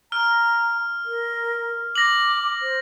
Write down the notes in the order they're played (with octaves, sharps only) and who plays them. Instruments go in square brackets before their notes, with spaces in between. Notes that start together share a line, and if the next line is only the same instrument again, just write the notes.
[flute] A#5 [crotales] F6
[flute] A#4
[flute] D6 [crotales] A#6 F#7
[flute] C5